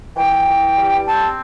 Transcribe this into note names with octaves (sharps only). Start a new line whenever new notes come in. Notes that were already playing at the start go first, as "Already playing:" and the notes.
E3 G5
E3
G3
C4 A5